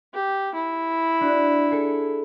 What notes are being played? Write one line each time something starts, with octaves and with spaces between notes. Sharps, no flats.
G4
E4
D4 F#4
G#4 A4 C#7